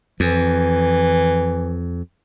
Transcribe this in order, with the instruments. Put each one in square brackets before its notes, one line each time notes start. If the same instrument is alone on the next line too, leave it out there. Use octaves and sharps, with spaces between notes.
[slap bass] F2 [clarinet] E3